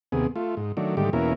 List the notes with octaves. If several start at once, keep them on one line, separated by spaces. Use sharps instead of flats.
D#2 C3 B3 G#4
A3 F4
G#2
D#3 F#3 A3 D4
G#2 D3 D#3 G3 A3 G4
E2 B2 A#3 C#4 E4 A#4